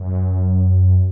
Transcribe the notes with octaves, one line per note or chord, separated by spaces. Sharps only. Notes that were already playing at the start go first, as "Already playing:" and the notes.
Already playing: F#2